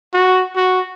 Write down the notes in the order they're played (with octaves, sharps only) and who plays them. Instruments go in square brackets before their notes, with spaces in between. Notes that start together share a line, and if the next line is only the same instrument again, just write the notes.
[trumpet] F#4
F#4